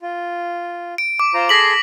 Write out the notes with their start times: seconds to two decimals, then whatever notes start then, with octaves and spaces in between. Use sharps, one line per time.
0.01 F4
0.98 D7
1.20 D6
1.34 F4 C5 A#5
1.49 G#4 A4 C6 A#6 B6 F#7